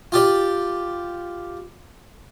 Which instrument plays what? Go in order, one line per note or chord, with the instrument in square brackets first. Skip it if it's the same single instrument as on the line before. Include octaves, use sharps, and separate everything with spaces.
[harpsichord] F4 G4 D5